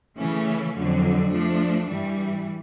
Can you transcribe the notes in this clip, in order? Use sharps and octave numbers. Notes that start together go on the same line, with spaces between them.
C#3 E3 A3 C#4
F2 D3 F#3
F3 A3 D4
G2 E3 G3